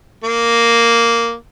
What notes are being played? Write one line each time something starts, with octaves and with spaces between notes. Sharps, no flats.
A#3